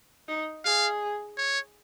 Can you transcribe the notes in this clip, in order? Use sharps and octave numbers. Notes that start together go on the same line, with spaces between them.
D#4
G#4 F5
C#5